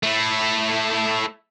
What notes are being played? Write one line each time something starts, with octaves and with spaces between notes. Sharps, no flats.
A3 E4